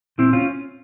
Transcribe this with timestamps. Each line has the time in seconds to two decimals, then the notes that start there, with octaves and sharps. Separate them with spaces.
0.18 A#2 C4 E4
0.33 C#4 F4